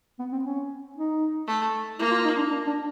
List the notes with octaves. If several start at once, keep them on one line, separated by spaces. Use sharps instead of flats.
B3
C4
C#4
D#4
A3
A#3 E4
F4
D#4
D4
D4
D4